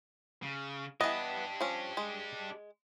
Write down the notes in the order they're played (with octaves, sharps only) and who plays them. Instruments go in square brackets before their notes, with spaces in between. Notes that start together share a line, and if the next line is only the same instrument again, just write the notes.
[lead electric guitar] C#3
[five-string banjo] E3 B3 [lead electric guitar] D4 G4 [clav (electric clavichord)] D#5
[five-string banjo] F3 C#4
G#3